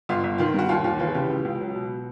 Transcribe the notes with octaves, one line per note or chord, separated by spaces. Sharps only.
G1 F4
G1
D#3 F4
G2 F#4
D#2 F4
D#2 F4
E3 F4
G#4
C#3 G4
C#2
C#2
F#3
B2